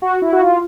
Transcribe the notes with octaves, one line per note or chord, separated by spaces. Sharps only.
F#4
E4
F#4
F4